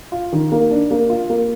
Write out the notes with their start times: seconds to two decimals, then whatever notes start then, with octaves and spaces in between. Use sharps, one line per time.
0.12 F4
0.33 D#3
0.52 A#3
0.71 D4
0.91 A#3
1.09 F4
1.30 A#3